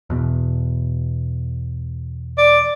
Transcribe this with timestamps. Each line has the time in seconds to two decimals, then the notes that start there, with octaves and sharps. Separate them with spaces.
0.10 E2 B2
2.38 D5